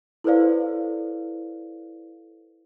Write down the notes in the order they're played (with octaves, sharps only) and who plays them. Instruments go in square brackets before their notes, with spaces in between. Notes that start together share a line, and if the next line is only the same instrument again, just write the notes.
[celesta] E4 A4 B4 C5 D5 F5